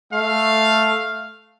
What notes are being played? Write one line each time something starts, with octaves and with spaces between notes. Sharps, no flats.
A3 F5